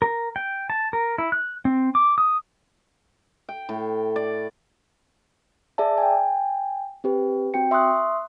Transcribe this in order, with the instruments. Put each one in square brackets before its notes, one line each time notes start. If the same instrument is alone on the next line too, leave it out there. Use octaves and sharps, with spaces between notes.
[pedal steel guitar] A#4
G5
A5
A#4
E4
F#6
C4
D6
D#6
[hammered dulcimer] G5
A2
D5
[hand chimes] G#4 D5 E5 A5
G5 G#5
C4 G4 B4
C4 F#4 G5 C#7
E5 C6 C#6 D#6 F#6